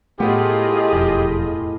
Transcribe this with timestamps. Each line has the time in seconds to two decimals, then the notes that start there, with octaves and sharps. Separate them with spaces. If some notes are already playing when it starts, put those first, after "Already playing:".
0.20 A2 A3 B3 F4 G4 G#4 D#5
0.93 E1 F2